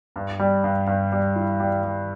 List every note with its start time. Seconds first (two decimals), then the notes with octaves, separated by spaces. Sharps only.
0.16 G2
0.39 G3
0.64 G2
0.87 G2
1.12 G3
1.36 E4
1.60 G3
1.83 G3